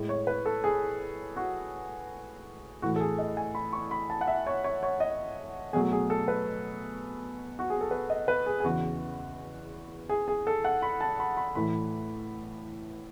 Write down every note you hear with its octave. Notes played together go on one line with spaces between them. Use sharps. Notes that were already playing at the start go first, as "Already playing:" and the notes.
Already playing: A2 G#3
C#5
B4
A4
G#4
F#4
A2 E3 A3 F#4
A4
G#4
D#5
G#5
B5
C#6
B5
A5
F#5
E5
C#5
C#5
C#5
D#5
B2 F#3 A3 G#4
G#4
A4
B4
F#4
G#4
A4
B4
D#5
B4
G#4
G#4
E2 C#3 E3 F#4
G#4
G#4
A4
F#5
B5
A5
B5
B5
A2 E3 A3 B5